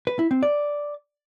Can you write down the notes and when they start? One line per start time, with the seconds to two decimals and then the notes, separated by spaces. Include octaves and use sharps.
0.07 B4
0.19 E4
0.31 C4
0.43 D5